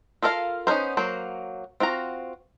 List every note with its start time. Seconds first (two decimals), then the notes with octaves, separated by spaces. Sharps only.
0.23 F4 A4 A#4 D5 F5
0.67 B3 C#4 D#4 A#4 C5
0.97 F#3 A#3 C5
1.80 C4 F4 F#4 A#5